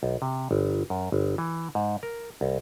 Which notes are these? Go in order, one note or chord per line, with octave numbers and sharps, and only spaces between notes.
B1
C3
G1
F#2
G1
E3
G#2
A#4
C2